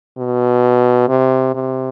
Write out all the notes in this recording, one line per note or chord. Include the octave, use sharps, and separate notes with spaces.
B2
C3
C3